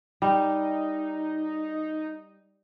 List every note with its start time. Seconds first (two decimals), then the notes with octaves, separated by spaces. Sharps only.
0.22 G3 D#4